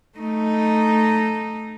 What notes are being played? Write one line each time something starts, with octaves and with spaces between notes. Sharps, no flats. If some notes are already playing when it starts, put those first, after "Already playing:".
A3 D#4